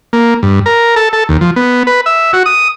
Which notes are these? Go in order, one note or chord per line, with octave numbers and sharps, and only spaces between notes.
A#3
G2
A#4
A4
A4
D#2
F3
B3
B4
E5
F#4
D#6